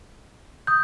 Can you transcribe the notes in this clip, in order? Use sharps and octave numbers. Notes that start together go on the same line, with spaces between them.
D#6 G6